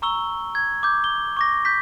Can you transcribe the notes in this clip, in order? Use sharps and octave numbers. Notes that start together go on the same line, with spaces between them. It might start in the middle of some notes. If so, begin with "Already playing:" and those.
A#5 C#6 E6 G7
G#6
D6 G6
G7
C#6 D6 A#6
G6 B6